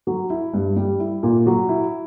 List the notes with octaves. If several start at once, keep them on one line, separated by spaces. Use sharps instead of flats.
F#3
E4
G2
G3
E4
A#2
F#3
E4